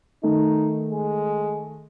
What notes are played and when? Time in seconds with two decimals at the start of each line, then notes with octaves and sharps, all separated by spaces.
0.23 D#3 A3 D#4
0.91 G#3